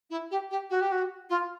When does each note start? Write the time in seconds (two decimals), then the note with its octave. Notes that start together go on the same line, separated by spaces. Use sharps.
0.10 E4
0.30 G4
0.50 G4
0.69 F#4
0.80 G4
0.91 F#4
1.29 F4